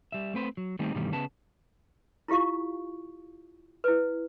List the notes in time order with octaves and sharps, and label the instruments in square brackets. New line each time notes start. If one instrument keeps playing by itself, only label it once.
[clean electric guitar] G3 E5
A3 C4 B4 C5
F#3
D#3 G3 A3 C4 D#4
G2 B2 D#3 E3 G3 A3
C#3 B3 B4 A5
[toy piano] E4 F4 G4 F5 C#6
E4 B4